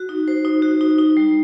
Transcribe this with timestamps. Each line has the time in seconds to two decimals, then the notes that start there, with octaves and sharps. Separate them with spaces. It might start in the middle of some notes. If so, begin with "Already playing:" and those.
Already playing: F#4
0.09 D#4
0.28 C5
0.45 D#4
0.62 F#4
0.81 D#4
0.98 D#4
1.17 G3